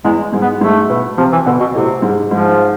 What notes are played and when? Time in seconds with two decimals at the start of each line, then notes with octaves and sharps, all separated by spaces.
0.04 E2 E3 G#3
0.32 G#2 G#3
0.42 B3
0.61 G#2 G#3 A3
0.89 B2 B3
1.18 C3 F3 C4
1.32 E3
1.46 B2 D3 B3
1.60 B2
1.74 A2 C3 A3
2.02 G#2 G#3
2.31 G#2 F3 G#3